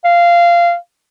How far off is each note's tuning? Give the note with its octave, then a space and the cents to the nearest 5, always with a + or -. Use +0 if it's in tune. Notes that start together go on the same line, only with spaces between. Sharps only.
F5 -15